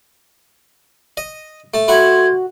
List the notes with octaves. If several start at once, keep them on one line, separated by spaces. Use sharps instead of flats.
D#5
A3 A5
A3 E4 F#4 F#5 C6 G#6